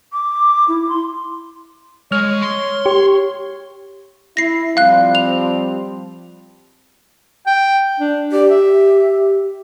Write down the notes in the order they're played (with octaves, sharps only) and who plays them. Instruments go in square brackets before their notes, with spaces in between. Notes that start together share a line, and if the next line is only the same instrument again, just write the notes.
[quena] D6
E4
C6
[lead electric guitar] G#3 [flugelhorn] C#5 [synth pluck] F6
[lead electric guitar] C6
[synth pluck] G4 [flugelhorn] C#5
[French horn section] E4 [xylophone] A#6 C7
[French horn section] F3 G3 C4 [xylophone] F5 F#6
[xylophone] F7
[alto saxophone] G5
D4
[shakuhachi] G4 [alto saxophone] D5
[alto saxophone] E5